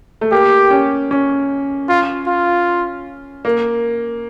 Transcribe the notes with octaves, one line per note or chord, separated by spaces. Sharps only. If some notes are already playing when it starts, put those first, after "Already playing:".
A3
A#3 G4
C#4
C#4
F4
F4
A#3